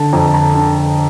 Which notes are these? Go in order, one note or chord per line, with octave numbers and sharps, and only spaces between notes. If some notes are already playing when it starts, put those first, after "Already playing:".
Already playing: D3 A5
F2 A#5
A5
A#5
D3 A5